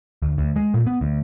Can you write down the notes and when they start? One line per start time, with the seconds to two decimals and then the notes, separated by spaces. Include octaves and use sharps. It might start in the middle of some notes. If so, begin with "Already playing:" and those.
0.22 D2
0.38 D2
0.56 G#3
0.74 A#2
0.87 B3
1.01 D2